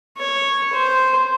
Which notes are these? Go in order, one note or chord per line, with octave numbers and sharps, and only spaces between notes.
C#5
C5